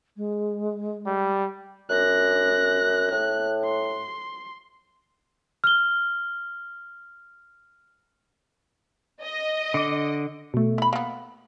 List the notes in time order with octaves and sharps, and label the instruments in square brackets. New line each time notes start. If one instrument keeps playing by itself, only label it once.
[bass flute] G#3
[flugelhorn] G3
[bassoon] F#2 [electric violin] F#6 A#6
[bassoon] A2 [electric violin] F#6
[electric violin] C6
[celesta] F6 G7
[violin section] D#5
[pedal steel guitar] D3 D6
[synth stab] B2 A3
[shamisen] E4 B5
A#3 B3